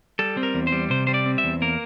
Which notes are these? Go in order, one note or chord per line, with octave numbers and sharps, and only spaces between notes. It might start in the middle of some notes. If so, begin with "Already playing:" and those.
G3 A4
C4
A#4
E2
C5
G3
C3 C5
G3 C5
D5
C4
E5
E2
A#3 A#4